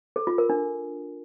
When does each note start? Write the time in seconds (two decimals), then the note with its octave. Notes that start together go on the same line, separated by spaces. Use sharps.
0.16 A4
0.27 F4
0.38 A#4
0.49 D4